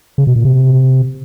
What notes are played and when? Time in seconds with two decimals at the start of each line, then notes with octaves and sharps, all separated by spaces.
0.18 C#3
0.27 B2
0.36 A#2
0.45 C3